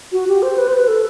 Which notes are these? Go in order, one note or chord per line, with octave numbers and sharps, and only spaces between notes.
F#4
G4
C5
B4
C5
B4
A4